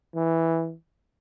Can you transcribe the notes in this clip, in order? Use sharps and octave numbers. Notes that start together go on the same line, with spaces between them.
E3